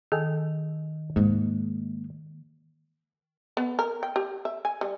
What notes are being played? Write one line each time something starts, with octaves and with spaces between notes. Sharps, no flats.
D#3 G#4 A4 G5
G#2 G#3 A#3
B3
A#4
G5
G4
E5
G#5
G3